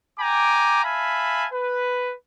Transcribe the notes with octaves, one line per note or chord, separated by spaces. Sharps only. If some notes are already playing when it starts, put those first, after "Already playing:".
G5 G#5 A#5 D6
E5 F5 G#5 A5 B5
B4